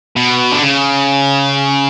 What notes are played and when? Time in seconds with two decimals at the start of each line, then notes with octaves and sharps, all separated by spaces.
0.16 B2
0.52 D3
0.63 C#3